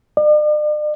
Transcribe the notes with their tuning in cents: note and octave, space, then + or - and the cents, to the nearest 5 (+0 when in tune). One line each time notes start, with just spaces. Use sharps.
D5 +40